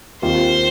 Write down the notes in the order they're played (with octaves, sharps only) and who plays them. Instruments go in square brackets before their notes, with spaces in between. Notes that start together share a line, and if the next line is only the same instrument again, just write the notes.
[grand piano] D#2 D#3 C4 F4 [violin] C5